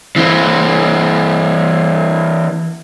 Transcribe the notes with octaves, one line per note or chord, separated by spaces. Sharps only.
E3 C4